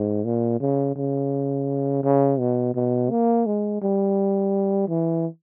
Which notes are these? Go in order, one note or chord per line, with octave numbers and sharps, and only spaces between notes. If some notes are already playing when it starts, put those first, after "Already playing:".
Already playing: G#2
A#2
C#3
C#3
C#3
B2
B2
A#3
G#3
G3
E3